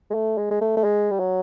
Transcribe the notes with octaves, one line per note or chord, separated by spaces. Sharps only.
G#3
A3
G#3
G#3
A3
A3
G#3
G3
F#3